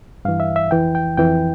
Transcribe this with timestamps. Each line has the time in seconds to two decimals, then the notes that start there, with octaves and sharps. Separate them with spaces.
0.25 G2 E3 F5
0.40 E5
0.56 E5
0.71 F2 E3 G5
0.95 G5
1.17 F2 E3 G5